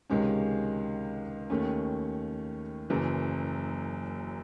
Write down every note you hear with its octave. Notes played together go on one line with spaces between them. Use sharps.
C#2 C3 D#3 G#3 C#4
D#2 D#3 A3 C#4
F#1 F#2 E3